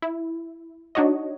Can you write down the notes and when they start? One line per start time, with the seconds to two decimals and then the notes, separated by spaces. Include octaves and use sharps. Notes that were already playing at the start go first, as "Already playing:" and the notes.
0.02 E4
0.95 D4 D#4 F#4 C#5 D#5